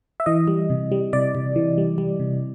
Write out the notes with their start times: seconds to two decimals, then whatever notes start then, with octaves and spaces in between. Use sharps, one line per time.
0.20 E5
0.26 E3 D#5
0.47 G3
0.70 C3
0.92 G3
1.13 C3 D5
1.35 C3
1.56 E3
1.78 G3
1.98 G3
2.20 C3